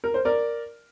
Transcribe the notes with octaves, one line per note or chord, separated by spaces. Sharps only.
A#4
C5
A#4 D5